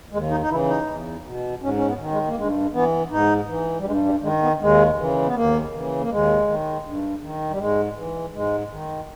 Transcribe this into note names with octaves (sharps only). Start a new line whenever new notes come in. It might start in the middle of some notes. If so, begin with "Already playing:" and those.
D#2 G#3
D#4
D#4
C#3 E3 E4
D#4
E2
B2
G#2 C#4
C#4
B3
D#3
G#3
A#3
G2 G#3
E3 B3
G#2 D#4
E3
G3
G2 G#3
G3
D#3 G#3
B3
D#2 G#3
C#3 E3
B3
D#2 A#3
C#3 E3
A#3
D#2 G#3
D#3
G2
D#3
G3
G#2 G#3
E3
G#2 G#3
D#3